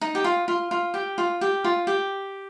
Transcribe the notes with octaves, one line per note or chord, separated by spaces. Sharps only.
D#4
G4
F4
F4
F4
G4
F4
G4
F4
G4